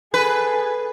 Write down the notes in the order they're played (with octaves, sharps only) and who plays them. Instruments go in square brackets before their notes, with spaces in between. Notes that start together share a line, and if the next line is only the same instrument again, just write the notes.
[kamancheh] G#4 A4 [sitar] B4